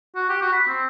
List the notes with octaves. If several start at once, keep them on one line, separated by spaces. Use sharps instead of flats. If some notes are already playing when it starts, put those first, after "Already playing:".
F#4
G4
F#4
B5
C4